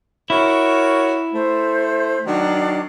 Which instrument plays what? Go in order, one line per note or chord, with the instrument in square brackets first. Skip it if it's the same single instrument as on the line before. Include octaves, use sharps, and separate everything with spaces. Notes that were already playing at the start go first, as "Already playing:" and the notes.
[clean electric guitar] E4 [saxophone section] F#4 A#4 C#5
[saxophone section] A3 [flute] C5
[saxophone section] D#3 F#3 F#4 [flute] D4